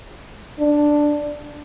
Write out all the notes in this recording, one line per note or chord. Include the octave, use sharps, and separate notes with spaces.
D4